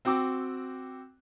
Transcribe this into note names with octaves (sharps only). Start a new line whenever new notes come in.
C4 F#4 G5 D6 E6